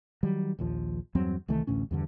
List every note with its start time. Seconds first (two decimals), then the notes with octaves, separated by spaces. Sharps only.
0.23 D#3 F#3 G3
0.59 A#1 D#2 F3
1.15 E2 G2 F#3 C4
1.48 C2 D#3 E3 A3
1.67 A1 D2 A2 C#4
1.91 E2 G2 D3